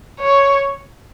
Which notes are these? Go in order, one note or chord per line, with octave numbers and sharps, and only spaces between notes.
C#5